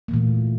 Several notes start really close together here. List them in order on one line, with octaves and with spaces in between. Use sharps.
A#3 E3 A#2 A3